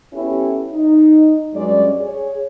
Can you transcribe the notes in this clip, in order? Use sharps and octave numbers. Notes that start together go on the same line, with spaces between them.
B3 C#4 E4 G4 A4
D#4
G2 F#3 G#3 C#4 D5
G#4 C#5